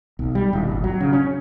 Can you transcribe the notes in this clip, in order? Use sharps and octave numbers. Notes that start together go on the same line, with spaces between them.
B1
G3
D#1
G#1
F#3
C#3
C#4